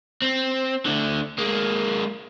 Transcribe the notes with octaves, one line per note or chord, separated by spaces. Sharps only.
C4
D2 D3
G#3 A#3